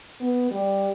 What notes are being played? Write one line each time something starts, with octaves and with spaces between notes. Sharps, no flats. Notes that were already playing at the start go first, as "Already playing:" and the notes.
B3
G3